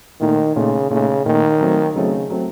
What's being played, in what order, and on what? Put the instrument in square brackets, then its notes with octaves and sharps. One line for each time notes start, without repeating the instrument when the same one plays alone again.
[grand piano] A#2 A3 D#4 [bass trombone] D#3
[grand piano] A#2 A3 D#4 [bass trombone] C#3
[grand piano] A#2 A3 D#4 [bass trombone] C#3
[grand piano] A#2 A3 D#4 [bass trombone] D#3
[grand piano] F#3 A3 C4
[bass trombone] C#3 [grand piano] F#3 A3 C4
[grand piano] F#3 A3 C4